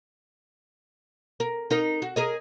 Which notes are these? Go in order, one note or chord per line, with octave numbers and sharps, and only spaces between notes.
A#4
D#4 A#4
F#4
G#4 A#4 D#5